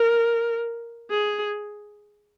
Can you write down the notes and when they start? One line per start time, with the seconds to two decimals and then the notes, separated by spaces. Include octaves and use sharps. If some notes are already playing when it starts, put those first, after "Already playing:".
Already playing: A#4
1.10 G#4